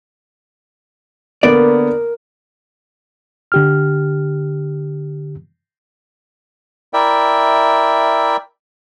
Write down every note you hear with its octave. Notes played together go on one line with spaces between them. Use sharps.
D3 A#3 B3 A#4 D5
D3 G4 F6
E4 A#4 D5 E5 G5